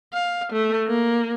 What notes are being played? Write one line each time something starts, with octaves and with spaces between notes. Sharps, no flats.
F5
A3
A#3